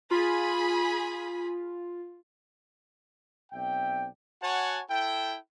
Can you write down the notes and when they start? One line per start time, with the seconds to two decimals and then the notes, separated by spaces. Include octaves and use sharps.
0.11 F4 G#4 B5
3.53 B1 C4 D5 E5 G5
4.43 F#4 C#5 F#5 G#5 A5
4.91 E4 A4 G5